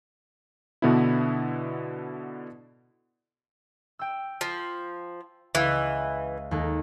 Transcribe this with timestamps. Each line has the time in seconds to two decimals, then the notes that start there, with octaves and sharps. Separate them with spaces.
0.82 B2 D3 B3 D4 E4
3.99 G5 E6
4.41 F3
5.55 C#2 E3 F5 E6
6.51 D#2 G#3 A4